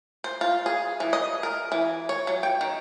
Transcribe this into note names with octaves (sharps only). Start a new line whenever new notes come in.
C5
F4
G#4
E3
D#5
A#4
E3
C#5
F#3
G5
D#3